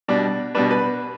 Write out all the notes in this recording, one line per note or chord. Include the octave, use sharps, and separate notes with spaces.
B2 G3 D4
B2 G3 D4 B4
B4